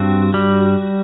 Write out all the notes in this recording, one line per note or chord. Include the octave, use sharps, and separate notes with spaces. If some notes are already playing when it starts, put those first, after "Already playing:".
Already playing: G2 C4 F#4
G3